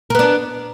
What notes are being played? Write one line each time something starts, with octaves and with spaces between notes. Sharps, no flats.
B3 D4 A#4